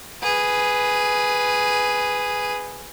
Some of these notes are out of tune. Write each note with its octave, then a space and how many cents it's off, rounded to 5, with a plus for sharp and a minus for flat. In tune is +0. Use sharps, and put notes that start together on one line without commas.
G#4 +0 B4 +0